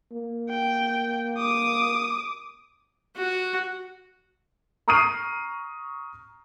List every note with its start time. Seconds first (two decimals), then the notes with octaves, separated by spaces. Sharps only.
0.12 A#3
0.49 G5
1.37 D6 D#6
3.16 F#4
4.88 A#5 C#6 D#6 F6 C7 D#7